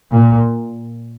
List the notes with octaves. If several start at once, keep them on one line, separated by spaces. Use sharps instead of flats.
A#2